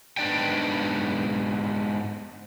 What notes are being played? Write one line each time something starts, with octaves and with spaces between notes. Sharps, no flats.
G#2 B3 D4 D5 G5